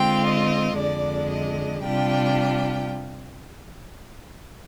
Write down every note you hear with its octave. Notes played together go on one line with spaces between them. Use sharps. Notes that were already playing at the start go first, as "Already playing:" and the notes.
Already playing: D3 G#3 C4 F4 G5
D#5
F2 D3 G#3 D4 D5
D#5
C3 G3 D4 F4 G5